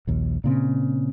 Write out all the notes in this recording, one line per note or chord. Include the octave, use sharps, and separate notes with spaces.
A#1 D#2
A#2 C#3 C4